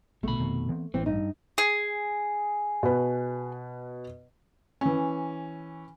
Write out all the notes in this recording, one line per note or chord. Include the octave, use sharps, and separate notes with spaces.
A#1 B2 D3 A3 B5
F1 D#3 C4
E3 B3 C4
A1 E3 C4
G2 D#4
G#4
B2 B4
E3 C#4